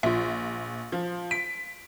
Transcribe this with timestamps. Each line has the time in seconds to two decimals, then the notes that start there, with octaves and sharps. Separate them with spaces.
0.03 A#1 F4 E5
0.92 F3
1.31 B6 D7